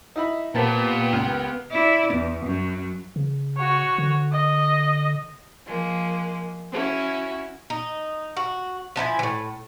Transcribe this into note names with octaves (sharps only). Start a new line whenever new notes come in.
D#4 E4 B5
A#2 A#3 B3 G4 A#4 C5 A5
C#2
E4 D5
E2
F#2 F#3
C#3
F#4 C#5
D3
D#5
F3 G#3 A#3
C#4 E4 F#4
D#4
F#4
F3 D4 E4 G#5
A2 E3